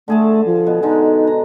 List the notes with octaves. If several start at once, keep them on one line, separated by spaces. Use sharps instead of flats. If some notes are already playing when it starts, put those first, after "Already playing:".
D3 A3 G#4 A5
F3
B2
D3 G#3 D#4
A#5